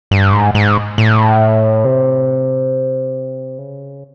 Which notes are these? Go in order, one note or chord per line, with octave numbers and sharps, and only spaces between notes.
G2
G#2
G#2
A2
C3
C#3